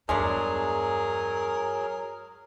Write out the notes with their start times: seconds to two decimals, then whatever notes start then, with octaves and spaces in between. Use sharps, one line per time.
0.09 E2 G2 F#3 G#3 A3 D4 G#4 A#4